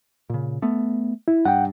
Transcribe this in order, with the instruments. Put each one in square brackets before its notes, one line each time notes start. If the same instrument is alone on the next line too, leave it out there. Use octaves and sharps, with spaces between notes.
[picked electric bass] A#2 C#3
A3 B3
[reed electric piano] E4
[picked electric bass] G2 [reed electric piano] F#5 G5